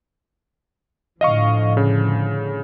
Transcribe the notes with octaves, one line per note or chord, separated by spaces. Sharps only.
A2 D3 F3 D#5 F5 C#6
C#3